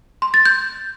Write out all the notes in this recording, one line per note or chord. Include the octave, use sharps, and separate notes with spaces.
C6
A6
G6